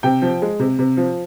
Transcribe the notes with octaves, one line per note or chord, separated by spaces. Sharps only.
C3 G5
F3
G#3
C3
C3
F3